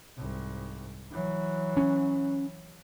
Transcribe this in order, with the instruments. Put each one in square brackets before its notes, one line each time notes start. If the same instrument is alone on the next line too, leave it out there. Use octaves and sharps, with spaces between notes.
[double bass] C2 G#2
E3 F#3
[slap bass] C#4